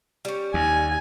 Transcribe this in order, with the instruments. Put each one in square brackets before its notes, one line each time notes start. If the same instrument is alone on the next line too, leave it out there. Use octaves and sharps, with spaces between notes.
[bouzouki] G3 C#4
[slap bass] D#2 [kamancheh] G#5